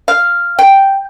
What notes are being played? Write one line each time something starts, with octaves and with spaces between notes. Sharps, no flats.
F5
G5